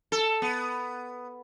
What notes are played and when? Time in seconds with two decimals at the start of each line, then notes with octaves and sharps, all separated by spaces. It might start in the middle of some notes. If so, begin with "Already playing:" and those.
0.12 A4
0.42 B3